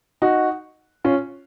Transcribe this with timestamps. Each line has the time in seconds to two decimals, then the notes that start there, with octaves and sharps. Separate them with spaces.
0.22 D#4 F#4
1.04 C#4 F4